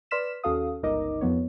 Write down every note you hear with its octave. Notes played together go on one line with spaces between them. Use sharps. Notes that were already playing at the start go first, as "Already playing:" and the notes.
B4 D5 C6 F6 B6 E7
D#2 C#4 F#4 A4 F5 D#6
G1 C#2 D#4 A#4 D#5 D6
F2 F3 B3 C#5